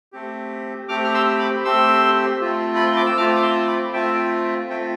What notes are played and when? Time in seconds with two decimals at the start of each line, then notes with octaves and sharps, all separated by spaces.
0.13 A3 C4 G4
0.88 A3 C4 G4 D6 F6
1.04 F6
1.14 C6 E6
1.39 B5 D6
1.64 A3 C4 G4 C6 E6
2.41 A3 C4 F4
2.76 B5
2.86 C6
2.96 D6
3.07 E6
3.17 A3 C4 F4 D6 F6
3.35 D6
3.43 C6 E6
3.68 B5 D6
3.93 A3 C4 F4 E5 G5
4.69 A3 C4 F4 E5 G5